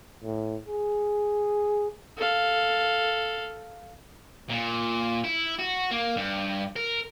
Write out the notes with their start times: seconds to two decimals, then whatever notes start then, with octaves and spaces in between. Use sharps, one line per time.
0.24 A2
0.67 G#4
2.17 A4 F5
4.49 A#2
5.24 E4
5.59 F#4
5.91 A#3
6.17 G2
6.76 A#4